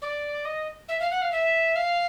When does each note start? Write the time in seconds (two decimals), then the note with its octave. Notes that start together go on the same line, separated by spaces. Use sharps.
0.02 D5
0.45 D#5
0.88 E5
1.00 F5
1.11 F#5
1.22 F5
1.32 E5
1.76 F5